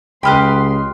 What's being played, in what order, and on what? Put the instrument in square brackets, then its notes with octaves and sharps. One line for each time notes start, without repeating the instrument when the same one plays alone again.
[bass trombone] C#2 [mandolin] G4 D#5 B5 [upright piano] G5 F6 F#6 [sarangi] C6